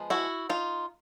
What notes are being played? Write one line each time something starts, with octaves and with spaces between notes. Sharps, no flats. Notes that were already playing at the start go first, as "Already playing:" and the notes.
Already playing: F3 G#3 B3
E4 F#4
D#4 F4